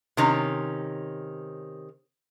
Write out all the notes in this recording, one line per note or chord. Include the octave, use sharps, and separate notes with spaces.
C3 D#3 C#4